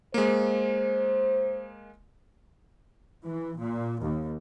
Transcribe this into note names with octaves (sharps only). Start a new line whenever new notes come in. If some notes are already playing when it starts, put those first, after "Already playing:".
G#3 A#3 C5
E3
A#2
D#2